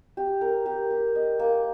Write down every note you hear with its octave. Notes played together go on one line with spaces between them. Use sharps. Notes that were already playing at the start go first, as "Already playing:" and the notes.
G4
A#4
G4
G4
D#5
A#3